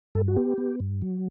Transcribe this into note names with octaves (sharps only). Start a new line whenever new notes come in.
G2 A4
F#4
B3 G4
B3
G2
F#3